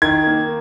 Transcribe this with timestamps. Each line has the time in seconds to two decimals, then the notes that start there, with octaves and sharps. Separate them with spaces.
0.02 D#3 G#6
0.27 A#3